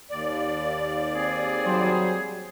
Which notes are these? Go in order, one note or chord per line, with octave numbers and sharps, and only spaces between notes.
D#2 D5
C4 G#4
F#3 G3 C5